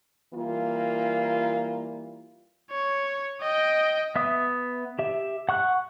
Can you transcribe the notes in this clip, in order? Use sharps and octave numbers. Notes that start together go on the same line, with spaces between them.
E3 G3 A#3 F4
C#5
D#5 G5
B3 E5 D#6
G4 E5
F#5 C#6 F#6